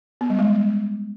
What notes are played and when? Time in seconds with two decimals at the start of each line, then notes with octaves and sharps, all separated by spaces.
0.21 B3
0.30 G3
0.39 G#3